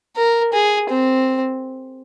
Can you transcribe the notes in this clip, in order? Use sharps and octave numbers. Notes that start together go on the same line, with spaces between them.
A#4
G#4
C4